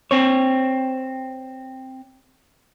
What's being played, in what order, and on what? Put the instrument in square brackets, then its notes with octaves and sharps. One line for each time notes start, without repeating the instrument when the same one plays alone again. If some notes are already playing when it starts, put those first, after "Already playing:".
[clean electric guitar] C4 C#5